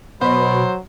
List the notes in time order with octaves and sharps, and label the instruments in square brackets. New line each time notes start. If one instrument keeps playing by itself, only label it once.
[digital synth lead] B2 [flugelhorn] F#3 [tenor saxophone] C5 [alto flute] B5